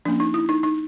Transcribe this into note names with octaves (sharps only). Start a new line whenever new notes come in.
F3 A#3 C#4 D4
D#4
E4
D#4
D#4